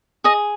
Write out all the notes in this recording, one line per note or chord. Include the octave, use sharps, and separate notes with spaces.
G#4 D#5